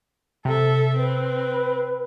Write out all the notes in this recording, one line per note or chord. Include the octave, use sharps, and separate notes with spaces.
C3 A4 E5
C4 B4